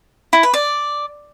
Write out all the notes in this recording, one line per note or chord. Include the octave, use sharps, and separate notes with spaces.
E4
B4
D5